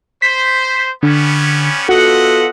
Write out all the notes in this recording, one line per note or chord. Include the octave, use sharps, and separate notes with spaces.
C5 B6
D3 G3 B3 C#4
B3 F4 F#4 A4 D#5 E5 F#5